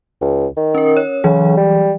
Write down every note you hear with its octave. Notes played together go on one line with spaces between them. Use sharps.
C#2
D#3
C#4 A#4
C#5
C#3 E3 F#3 G#4
G3